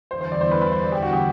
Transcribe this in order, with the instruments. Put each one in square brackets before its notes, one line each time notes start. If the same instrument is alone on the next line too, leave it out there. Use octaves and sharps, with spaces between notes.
[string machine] E2 D3 G3 B3 E4 [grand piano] C5
[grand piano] C5
D5
C5
B4
B4
C5
D5
G4
F#4
G4